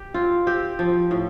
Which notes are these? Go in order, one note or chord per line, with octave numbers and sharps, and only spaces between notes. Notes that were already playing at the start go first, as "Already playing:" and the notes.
Already playing: G4
C4 F4
C4 G4
F3
A2